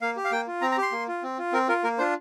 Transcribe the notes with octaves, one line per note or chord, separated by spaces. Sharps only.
A#3 F5
G4
F5
A#3 G5
F4
C4 A#5
A#5
G4 C6
A#3
F4
C4
F4
C4 A#4
F4 A#4
A#3 A#4
D4 F4 C5